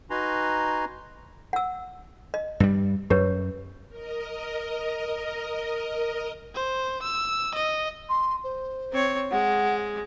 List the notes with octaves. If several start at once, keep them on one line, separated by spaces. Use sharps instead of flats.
D#4 F#4 B4 G#5 A#5 C6
F#5 E6
D#5
G2 G3
F#2 G4 B4 C#5
A#4 D#5
C5
E6
D#5
C6
C5
C4 C#5
G#3 F#5